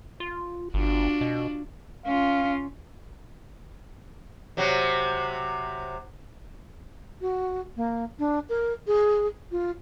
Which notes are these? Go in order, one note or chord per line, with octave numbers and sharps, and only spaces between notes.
F4
G1 D4 F4 F#4
B2
C#4 F4 F5
C3 F#3
F#4
A#3
D4
A#4
G#4
F4